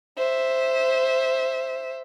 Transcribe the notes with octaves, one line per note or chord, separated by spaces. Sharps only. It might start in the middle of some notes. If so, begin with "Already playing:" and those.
C5 E5